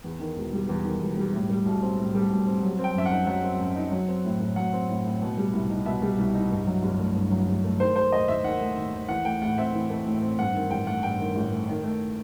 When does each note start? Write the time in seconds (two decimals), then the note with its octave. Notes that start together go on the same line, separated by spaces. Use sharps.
0.04 E2
0.20 D#3
0.36 E1
0.53 G3
0.69 E2
0.84 D#3
1.00 E1
1.17 G3
1.34 A2
1.49 G3
1.66 B1
1.82 C4
1.98 A2
2.14 G3
2.30 B1
2.46 C4
2.62 F#3
2.79 C4
2.84 G5
2.95 F#2 E5
3.06 F#5
3.11 D#4
3.27 F#3 F#5
3.43 C4
3.60 F#2
3.76 D#4
3.92 F#3
4.08 C4
4.24 A2
4.40 A2
4.56 F#3 F#5
4.73 C4
4.89 A2
5.05 A2
5.22 B2
5.37 G3
5.53 C2
5.70 D#4
5.86 B2 E5
6.02 G3
6.18 C2
6.34 D#4
6.51 G2
6.67 F#3
6.83 G1
6.99 A3
7.15 G2
7.31 F#3
7.48 G1
7.64 A3
7.80 D#3 C5
7.96 A3 C5
8.12 D#2 D#5
8.28 D#2 E5
8.44 D#3 F#5
8.61 A3
8.77 D#2
8.93 D#2
9.09 E3 F#5
9.25 A3 G5
9.42 A2 F#5
9.58 C4 E5
9.74 E3
9.90 A3
10.06 A2
10.22 C4
10.39 G2 F#5
10.55 D#3
10.70 A1 G5
10.87 A3 F#5
11.03 G2 G5
11.19 D#3
11.35 A1
11.52 A3
11.68 D#3
11.84 A3